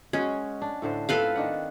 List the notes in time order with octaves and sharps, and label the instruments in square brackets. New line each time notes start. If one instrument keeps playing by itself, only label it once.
[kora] G#3 F#4 [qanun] C#4
[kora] D4
A2 D3 C5
[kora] C4 F4 [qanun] A4 B4 F5
[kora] D#3 D4 F#5